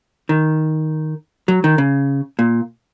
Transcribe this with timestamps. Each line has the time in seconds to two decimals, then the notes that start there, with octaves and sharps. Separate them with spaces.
0.29 D#3
1.48 F#3
1.64 D#3
1.78 C#3
2.39 A#2